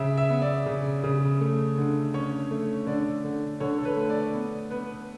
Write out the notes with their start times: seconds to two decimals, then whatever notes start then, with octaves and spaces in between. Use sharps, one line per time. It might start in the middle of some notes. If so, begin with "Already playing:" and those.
Already playing: C#3 E5
0.17 E5
0.30 B3
0.42 D5
0.66 C#3
1.04 C#3
1.41 A3
1.77 D3
2.14 C#4 C#5
2.51 A3
2.86 D3 D5
3.24 D3
3.60 D3 C#5
3.78 A4
3.85 B4
3.97 A3
4.10 D5
4.34 B3
4.71 B3 B4